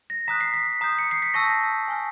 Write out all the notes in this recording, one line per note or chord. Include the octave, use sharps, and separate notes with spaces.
A#6
A#5 D#6 F#6 B6
C7
B6
A#5 D#6 G6
C#7
C7
B6
A5 C#6 E6 G6 A#6
G#5 C#6 F6